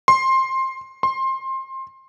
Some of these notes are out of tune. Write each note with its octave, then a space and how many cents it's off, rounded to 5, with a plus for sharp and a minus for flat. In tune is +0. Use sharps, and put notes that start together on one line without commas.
C6 +15
C6 +20